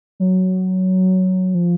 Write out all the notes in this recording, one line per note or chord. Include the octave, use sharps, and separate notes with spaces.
F#3
F3